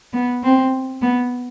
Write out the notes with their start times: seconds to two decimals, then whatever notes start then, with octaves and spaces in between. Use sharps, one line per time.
0.13 B3
0.43 C4
1.02 B3